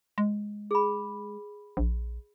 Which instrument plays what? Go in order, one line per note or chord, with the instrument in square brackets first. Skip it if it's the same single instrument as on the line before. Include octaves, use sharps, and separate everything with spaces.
[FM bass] G#3
[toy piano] G#4 B5
[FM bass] A#1